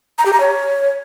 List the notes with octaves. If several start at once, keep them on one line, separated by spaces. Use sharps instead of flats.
A#5
G4
A#5
C#5